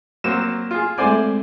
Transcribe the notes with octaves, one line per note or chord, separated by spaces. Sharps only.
F#3 A#3 C4 E7
F4 G#4
G#3 A3 C4 C5 D5 G#5